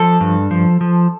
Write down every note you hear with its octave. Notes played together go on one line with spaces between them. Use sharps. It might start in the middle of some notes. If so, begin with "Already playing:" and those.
Already playing: F3 A4
G2
F3
F3